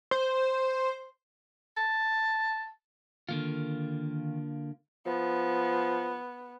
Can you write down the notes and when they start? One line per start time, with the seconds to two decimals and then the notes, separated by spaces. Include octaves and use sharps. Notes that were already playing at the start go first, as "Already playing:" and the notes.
0.11 C5
1.77 A5
3.29 D3 D#3 A#3 F4
5.06 F3 B3